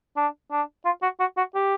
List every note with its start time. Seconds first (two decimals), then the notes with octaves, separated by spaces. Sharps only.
0.17 D4
0.51 D4
0.85 F4
1.02 F#4
1.20 F#4
1.37 F#4
1.55 G4